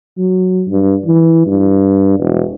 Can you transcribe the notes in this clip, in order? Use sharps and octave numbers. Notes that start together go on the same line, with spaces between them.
F#3
G2
E3
G2
E1